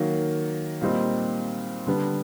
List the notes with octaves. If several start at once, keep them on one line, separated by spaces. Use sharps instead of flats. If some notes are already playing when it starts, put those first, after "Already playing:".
Already playing: D#3 F#3 A#3
A#2 G3 C4 D#4
D3 G3 B3 D4